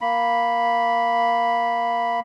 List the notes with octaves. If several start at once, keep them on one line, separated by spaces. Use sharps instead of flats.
A#3 B5